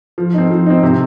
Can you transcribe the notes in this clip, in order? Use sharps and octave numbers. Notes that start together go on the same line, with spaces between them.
F3
C4 D#4
F3
C4 D#4
C3